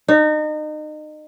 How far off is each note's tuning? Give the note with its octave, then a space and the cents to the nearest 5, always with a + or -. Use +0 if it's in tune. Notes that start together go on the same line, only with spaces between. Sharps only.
D#4 -30